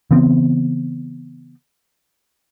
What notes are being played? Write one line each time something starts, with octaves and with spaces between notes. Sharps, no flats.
C#3 E3 B3 C4